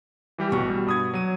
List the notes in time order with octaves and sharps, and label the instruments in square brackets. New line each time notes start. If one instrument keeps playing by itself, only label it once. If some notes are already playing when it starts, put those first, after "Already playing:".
[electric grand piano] E3 G3 G4
[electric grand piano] A1 C#6 [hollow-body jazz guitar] B2
[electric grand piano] G3
G2 D#6 G#6
F#3 D#7